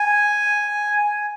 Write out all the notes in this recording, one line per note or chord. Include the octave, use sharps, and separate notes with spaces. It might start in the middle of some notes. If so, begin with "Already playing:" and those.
Already playing: G#5
G#5